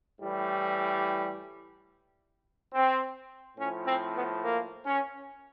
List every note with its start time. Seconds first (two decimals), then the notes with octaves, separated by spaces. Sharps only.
0.19 A2 E3 G3
2.73 C4
3.58 A2 F3 C#4
3.85 C4
4.14 B3
4.42 A#3
4.85 C#4